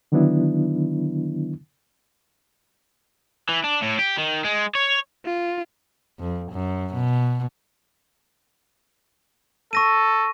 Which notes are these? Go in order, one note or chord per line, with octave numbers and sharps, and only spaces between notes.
D3 D#3 F#3 B3 D4 E4
E3
D4
A2
G4
D#3
G#3
C#5
F4
F2
F#2
B2
A4 C#6 A#6 D#7